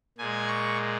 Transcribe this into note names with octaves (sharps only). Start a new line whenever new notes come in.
A#2 G#3 G#5
C#6